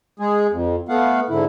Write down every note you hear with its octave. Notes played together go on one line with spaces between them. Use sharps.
G#3 G#4
F2
A3 B3 F5 F#5
G#2 D3 E4